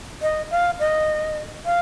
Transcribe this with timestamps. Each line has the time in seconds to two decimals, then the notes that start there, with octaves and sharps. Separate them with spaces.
0.22 D#5
0.51 F5
0.80 D#5
1.66 F5